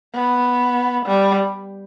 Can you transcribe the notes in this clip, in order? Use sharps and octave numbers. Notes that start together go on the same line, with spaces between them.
B3
G3